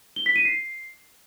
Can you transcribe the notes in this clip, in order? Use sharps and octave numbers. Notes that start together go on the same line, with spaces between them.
G7
B6
D#7
C7